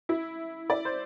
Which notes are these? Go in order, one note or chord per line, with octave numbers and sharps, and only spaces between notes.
E4
D5
C5